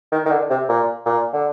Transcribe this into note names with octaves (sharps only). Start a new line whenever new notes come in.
D#3
D#3
D3
C3
A#2
A#2
D3